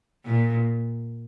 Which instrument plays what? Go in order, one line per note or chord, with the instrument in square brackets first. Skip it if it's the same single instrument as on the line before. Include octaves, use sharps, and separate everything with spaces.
[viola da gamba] A#2